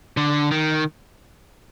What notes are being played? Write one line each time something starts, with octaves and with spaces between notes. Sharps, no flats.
D3
D#3